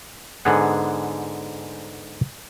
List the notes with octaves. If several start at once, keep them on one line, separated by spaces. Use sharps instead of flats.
G#2 D3 B3 G#4 F#5